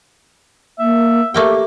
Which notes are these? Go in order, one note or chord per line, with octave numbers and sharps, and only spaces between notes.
A#3 E5
A3 A#3 G4 G5